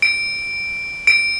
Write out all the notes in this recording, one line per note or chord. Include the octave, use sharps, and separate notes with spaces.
D7
D7